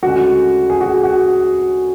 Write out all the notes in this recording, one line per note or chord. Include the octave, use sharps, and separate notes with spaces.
D2 C#3 G#3 F#4
G#4
F#4
F#4